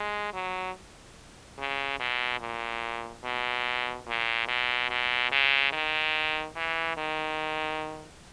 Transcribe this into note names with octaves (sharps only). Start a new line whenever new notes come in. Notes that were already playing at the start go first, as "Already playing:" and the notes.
Already playing: G#3
F#3
C#3
B2
A#2
B2
A#2
B2
B2
C#3
D#3
E3
D#3